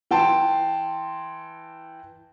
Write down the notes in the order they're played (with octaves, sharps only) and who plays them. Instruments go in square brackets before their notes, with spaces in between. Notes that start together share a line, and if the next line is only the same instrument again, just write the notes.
[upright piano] E3 G5 A5 C6